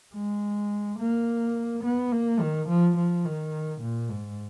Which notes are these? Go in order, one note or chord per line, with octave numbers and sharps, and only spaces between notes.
G#3
A#3
B3
A#3
D#3
F3
F3
D#3
A#2
G#2